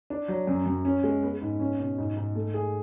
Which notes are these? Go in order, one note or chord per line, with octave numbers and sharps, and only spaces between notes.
D4
F#3
F#2
F#2
C#4
G#3
B3
G#2
C#4
B2
G#2
G#2
A3
G#4